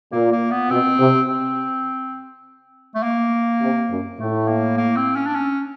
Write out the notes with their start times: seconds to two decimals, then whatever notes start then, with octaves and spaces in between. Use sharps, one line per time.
0.12 A#2 A#3
0.32 A#3
0.51 B3
0.70 B2 C4
0.99 C3
1.29 C4
2.95 A3
3.03 A#3
3.61 C3
3.90 F#2
4.19 A2 A3
4.48 A#3
4.77 A#3
4.96 C4
5.16 C#4
5.26 D4
5.35 C#4